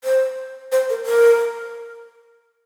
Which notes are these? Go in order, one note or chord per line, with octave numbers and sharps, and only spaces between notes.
C5
C5
A#4
A#4